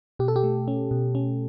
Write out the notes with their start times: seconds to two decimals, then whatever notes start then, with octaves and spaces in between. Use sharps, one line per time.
0.19 B2 G4
0.28 A4
0.36 G4
0.43 A3
0.68 C#4
0.91 B2
1.15 C#4